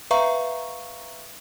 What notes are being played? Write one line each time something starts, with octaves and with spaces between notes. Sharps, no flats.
B4 E5 F5 A#5 C#6